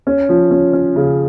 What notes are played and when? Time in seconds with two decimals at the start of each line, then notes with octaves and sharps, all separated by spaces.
0.07 C#4
0.29 F3
0.51 C#4
0.73 C#4
0.96 C#3